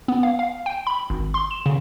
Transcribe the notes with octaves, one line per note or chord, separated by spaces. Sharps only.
B3
F5
F5
G5
B5
G#1
C6
E7
C#3